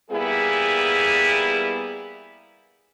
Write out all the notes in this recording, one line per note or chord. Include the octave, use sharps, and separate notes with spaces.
G3 A#3 B3 E4 G#4